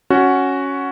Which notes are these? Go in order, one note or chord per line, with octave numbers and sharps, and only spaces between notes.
C#4 F#4